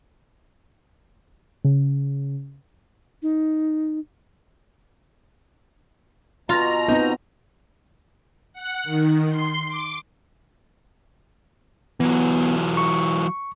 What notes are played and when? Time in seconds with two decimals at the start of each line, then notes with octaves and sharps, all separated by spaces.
1.65 C#3
3.23 D#4
6.49 B2 F4 A#5
6.88 B3 C4 D#4
8.53 F#5
8.84 D#3
9.29 C6
9.68 D6
12.00 E3 F#3 B3
12.77 C#6